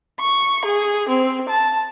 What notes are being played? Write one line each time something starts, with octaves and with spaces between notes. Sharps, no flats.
C#6
G#4
C4
A5